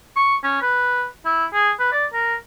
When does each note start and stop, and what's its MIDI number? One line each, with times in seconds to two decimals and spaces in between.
0.16 0.36 85
0.44 0.58 61
0.62 1.05 71
1.25 1.45 64
1.54 1.71 68
1.79 1.92 71
1.92 2.05 74
2.13 2.35 70